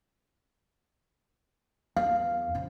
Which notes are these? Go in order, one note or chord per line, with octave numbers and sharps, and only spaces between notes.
E2 F5
F3 C#4